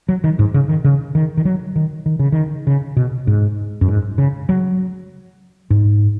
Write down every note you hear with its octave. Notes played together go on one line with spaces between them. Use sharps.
F#3
D#3
G#2
C#3
D#3
C#3
D#3
D#3
F#3
D#3
D#3
C#3
D#3
C#3
B2
G#2
F#2
G#2
C#3
F#3
G#2